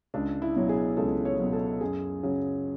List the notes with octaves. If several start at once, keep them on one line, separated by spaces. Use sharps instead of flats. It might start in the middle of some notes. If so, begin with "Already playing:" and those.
C#2 D4
E4
B2 F#3
G#4
C#2 A4
C#5
B2 F#3
A4
F#2 G#4
C#3 F#3